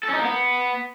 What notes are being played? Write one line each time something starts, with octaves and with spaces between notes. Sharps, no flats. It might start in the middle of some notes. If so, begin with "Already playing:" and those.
A4
C#4
D#4
A#3
B3